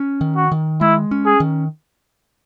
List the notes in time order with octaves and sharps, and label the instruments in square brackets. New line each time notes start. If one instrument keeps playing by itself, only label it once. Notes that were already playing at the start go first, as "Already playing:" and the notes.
Already playing: [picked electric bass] C#4
D#3
[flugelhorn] F#4
[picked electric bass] D#3
[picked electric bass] G#3 [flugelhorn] E4
[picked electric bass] C#4
[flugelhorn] G#4
[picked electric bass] D#3